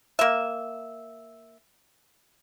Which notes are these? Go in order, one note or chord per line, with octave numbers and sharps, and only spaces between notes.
A#3 E5